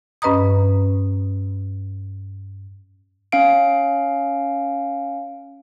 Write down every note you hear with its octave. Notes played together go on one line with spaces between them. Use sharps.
G2 C#4 B4 D#5 A#5 D#6
C#4 F5 D7